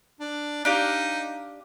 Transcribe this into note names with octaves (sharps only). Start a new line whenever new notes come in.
D4
D4 D#4 G4 F5